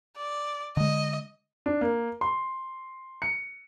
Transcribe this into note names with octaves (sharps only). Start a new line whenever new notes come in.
D5
D3 G#3 D#5
D4
A#3
C6
C#7